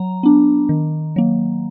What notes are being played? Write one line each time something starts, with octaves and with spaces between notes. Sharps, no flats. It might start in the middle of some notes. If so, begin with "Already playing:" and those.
Already playing: F#3 A#5
B3 D4
D#3
F#3 A#3